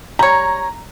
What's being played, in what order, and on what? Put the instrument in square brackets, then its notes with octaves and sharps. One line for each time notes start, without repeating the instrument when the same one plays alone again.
[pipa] G3 C#5 [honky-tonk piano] A#5